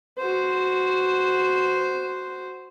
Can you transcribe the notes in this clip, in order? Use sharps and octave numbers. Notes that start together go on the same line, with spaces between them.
F#4 C5